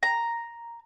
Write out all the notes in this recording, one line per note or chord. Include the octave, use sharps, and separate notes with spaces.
A#5